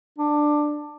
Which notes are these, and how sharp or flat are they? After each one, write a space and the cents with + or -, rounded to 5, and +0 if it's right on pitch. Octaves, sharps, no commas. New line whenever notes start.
D4 +10